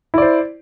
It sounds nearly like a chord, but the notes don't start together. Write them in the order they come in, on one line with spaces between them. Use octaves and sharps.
E4 D5 C5